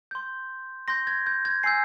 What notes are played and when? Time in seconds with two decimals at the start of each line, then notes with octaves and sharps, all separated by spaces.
0.11 C6 G6
0.88 C6 G6 A#6
1.07 G#6
1.27 G6
1.45 G#6
1.63 G#5 E6 G6 C7